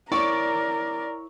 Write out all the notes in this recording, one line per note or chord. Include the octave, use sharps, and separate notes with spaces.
E4 A#4 C#5 D5 C#6